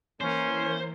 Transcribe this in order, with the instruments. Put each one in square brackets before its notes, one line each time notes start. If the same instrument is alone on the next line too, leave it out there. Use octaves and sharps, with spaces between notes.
[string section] E3 A#3 [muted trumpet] C#4 [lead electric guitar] C5